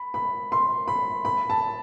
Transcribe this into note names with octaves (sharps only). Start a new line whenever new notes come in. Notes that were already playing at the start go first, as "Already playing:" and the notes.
Already playing: B5
B5
C6
B5
B5
A5